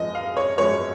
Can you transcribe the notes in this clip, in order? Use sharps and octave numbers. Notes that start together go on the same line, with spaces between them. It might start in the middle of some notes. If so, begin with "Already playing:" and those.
Already playing: F#2 F3 G#3 D#5
F5
C#5
F#2 F3 G#3 C#5